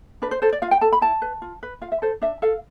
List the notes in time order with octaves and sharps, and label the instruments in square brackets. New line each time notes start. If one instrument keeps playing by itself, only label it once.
[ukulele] D4 B4
C5
A4 C5
D5
F4 F5
G5
A4 A5
B5
E4 A5
B4
F4
B4
F4 F5
E5
A4 C5
D4 E5
A4 F5